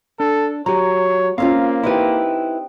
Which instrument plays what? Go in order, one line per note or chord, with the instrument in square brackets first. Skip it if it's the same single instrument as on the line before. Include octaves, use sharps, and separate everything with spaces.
[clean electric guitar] D4 [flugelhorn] A4
[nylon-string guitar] F#3 [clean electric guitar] G4 A#5 [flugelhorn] C#5
[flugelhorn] A#3 [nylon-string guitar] C4 C#4 F4 [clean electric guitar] F5
[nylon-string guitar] C4 D#4 G4 [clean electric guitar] E4 B4